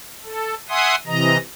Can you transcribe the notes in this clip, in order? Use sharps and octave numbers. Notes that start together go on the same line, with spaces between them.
A4
E5 F#5 G#5 C6 D#6
C3 E3 D#5 A#5